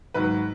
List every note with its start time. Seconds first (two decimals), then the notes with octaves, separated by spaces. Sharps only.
0.14 G#2 D#3 F#3 B4